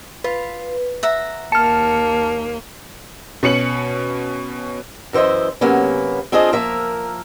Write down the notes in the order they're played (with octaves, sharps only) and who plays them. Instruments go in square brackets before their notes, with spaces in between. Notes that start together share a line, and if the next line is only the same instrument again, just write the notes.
[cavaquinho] F4 [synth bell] B4
[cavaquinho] E5 F#5 A#5
[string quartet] D#2 A#3 [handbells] A5 [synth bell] F6 C#7
[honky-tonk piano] B2 C#4 C#7 F#7
[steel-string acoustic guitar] F#2 E3 C5 D#5 E5
C3 F#3 A#3 B3 C#4
C4 D4 F4 G#4 D#5
F3 A#3 A#4 E5